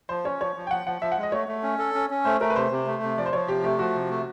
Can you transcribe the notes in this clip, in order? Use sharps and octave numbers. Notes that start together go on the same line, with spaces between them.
F3 C5
C#4 C#5
F3 C#5
F3
G5
F3 F#5
F3 F#5
F3 E5
F#5
G#3
D#5
A3 C#5
A3
C#4
A4
C#4
C#4
A3 C5
A3 A#4
B4
C3 C5
C3
A3
C3
F3 D5
C5
F3 C#5
C3 G4
A3 G4
F3 F#4
C3
A3